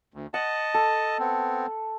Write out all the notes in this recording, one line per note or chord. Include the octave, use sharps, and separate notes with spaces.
D2
D#5 F#5 A5
A4
B3 C4